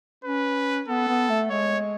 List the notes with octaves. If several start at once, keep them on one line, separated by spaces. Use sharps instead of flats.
C#4 B4
B3 A4
B3
A3
G#3 C#5